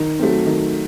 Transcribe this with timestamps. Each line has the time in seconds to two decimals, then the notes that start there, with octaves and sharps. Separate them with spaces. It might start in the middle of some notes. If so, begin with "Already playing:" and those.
Already playing: D#3
0.19 F#3 A3 C4
0.46 D#3